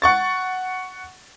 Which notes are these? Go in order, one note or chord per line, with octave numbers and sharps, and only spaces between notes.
F#5 C#6 A6